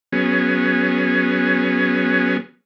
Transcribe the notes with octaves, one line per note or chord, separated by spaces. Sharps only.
F#3 B3 C#4 G#4